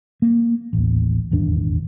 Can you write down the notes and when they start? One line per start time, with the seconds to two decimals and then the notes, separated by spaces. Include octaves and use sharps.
0.22 A#3
0.73 A1 D#2
1.31 D#1 G#1 E2 D4